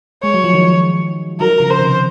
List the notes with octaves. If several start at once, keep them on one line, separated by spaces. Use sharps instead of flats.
G#3 C#5
F#3
F3
D#3 F#3
D#3 F#3 A#4
C#3 F3
C5
C3 D#3